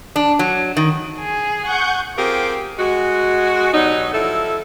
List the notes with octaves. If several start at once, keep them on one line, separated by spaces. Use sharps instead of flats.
D4
F#3
D#3
G#4
F#5 C#6 G6
C4 F4 G4 G#4 A#4
G#3 F#4
B2 F#3 G3 D#4
F3 E4 A4